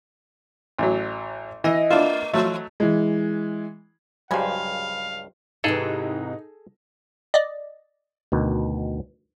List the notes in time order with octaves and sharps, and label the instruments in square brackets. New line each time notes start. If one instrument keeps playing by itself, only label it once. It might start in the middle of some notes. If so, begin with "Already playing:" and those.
[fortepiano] A1 F#3
[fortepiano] E3 [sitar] D#5
[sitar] A3 [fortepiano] D4 E4 F4
[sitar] E3 [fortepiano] F#3 A3
[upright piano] E3 G#3
[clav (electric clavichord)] C#2 G2 [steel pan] F#3 G3 C5 [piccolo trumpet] F5 [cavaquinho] G#5 B5
[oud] G#2 C3 E3 [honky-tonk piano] D#4 [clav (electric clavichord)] G#4 A4
[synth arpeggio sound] D5 D#5
[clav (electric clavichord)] D2 B2 D#3